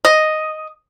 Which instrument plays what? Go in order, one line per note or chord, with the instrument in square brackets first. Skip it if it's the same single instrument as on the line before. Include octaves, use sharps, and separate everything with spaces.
[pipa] D#5